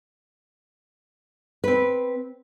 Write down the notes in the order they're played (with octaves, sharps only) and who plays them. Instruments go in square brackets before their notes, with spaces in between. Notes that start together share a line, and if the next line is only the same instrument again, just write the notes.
[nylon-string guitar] C4 B4